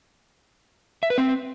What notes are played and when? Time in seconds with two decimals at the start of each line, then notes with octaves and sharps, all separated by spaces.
1.03 E5
1.10 B4
1.18 C4